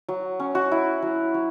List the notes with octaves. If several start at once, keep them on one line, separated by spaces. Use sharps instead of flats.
F#3
C#4
F#4
E4
F#3
F#3